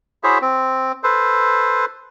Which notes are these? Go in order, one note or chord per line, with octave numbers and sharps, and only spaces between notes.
E4 F#4 G#4 C5 C#5 E5
C4
A4 B4 C5